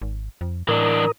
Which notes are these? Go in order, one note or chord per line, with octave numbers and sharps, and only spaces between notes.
G#1
F2
A2 E3 D4 A#4 A#5 D#6